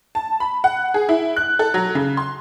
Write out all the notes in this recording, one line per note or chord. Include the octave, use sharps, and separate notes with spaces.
A5
B5
F#5
G#4
E4
F#6
A4
F#3
C#3
C6